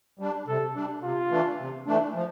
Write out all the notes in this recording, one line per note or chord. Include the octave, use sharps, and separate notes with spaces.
G3 D4
C3 A4
G3 D4
C3 F4
E3 A3 D4
C3
E3 A3 D4
F3